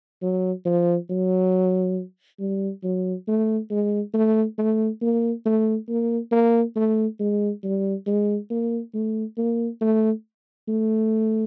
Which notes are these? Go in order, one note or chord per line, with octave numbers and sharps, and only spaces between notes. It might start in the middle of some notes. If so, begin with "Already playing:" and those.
F#3
F3
F#3
G3
F#3
A3
G#3
A3
A3
A#3
A3
A#3
A#3
A3
G#3
G3
G#3
A#3
A3
A#3
A3
A3